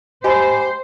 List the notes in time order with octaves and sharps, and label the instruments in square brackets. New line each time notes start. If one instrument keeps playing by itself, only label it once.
[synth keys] G4 [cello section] C5 [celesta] D#5 G#5 B5